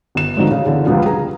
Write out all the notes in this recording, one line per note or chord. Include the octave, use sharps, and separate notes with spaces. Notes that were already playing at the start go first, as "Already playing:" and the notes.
G1 E7
G#2 D3 F3 C4 D#4 F#4
C#3
E2 D3 G#4
C#2 F3 G3 B3 F4
G#4 A#5